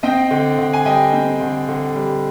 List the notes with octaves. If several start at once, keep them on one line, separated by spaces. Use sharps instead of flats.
C4 D#5 G5
D3
D3
G#5
G3 D#5 G5
C4
D3
D3
G3